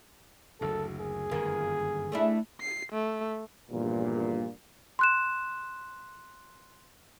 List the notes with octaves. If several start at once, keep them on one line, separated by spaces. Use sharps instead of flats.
F#1 D2 A4
G#4
G1 F#2 D#3 A#3
A3 D4 E4
C7
A3
A#1 E2 G2 A#2
C6 F#6 E7